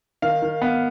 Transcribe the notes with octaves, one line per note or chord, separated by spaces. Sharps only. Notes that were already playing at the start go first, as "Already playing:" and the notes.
D#3 F5
D#3
B3